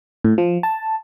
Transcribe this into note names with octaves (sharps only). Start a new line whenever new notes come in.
A2
F3
A5